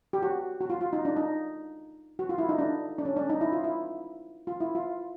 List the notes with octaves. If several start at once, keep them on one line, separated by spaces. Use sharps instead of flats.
G4
F#4
F#4
F4
F4
D#4
D4
D#4
F#4
F4
E4
D#4
D4
D4
C#4
D4
D#4
E4
F4
E4
F4
E4
F4